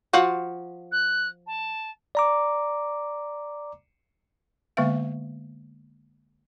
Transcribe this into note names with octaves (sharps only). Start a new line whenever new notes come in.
F3 F4 F#4
F#6
A5
D5 A#5 D6
D3 G#3 A#3 B3 E5 F5